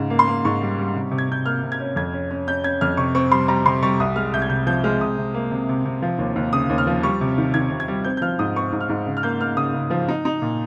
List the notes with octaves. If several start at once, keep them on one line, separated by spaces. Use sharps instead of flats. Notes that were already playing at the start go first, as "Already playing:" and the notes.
Already playing: G#2 C#3
A#3
C6
A#3
G#2 C#6
G3
G3
C3
C3
G#6
C3 G6
A#3 F6
C3
G#6
C#4
F2 G#6
C#4
C#4
C#4 G6
C#4 G#6
F2 F6
C3 C#6
C4 C#6
G3 C6
G3 A#5
C3 C6
G3 C#6
C2 D#6
G#3 F6
C2 G6
G#6
C3 G6
F3 G6
G#3 F6
C3 D#6
C3
A#3
C3
C3
C3
F3
D#2
D#2
C#3 D#6
D#2
F6
F3
G3 C#6
C3
D#3
D#3 G#6
C3
G#6
G3
C4 G6
G6
F3 F6
G#2 D#6
C4 C#6
G#2
F6
G#2
C#3
F6
A#3 G6
A#3 F6
C#3 D#6
C#3
F3
D#4
D#4
A#2